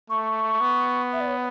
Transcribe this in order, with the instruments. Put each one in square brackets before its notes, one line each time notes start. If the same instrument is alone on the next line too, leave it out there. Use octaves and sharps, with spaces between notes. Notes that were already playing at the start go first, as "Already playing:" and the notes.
[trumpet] A3 [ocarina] C#6
[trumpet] B3
[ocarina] E5
D5
C#5